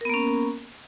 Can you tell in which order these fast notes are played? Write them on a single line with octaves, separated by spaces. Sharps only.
A#4 B3 A#3 C#4